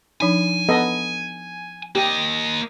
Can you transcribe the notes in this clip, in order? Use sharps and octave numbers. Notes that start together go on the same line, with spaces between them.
F3 D4 D#4 G#5
B3 A4 D#5
A#3 G4 D#5